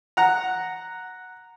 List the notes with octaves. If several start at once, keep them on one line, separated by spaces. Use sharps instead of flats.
F#5 A#5